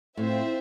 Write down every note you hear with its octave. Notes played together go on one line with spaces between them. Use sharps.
A2 C4 F4 C5 E5